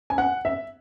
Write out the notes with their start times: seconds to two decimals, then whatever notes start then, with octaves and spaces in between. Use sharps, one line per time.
0.10 G#5
0.18 F#5
0.45 E5